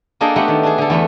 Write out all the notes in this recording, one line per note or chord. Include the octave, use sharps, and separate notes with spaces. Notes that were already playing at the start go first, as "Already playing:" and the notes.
A#3 D4 G#4 A4 D#5 G5
A3 B3 G4 F#5
D#3
D4 G#4
D3 A4
E2 A3 B3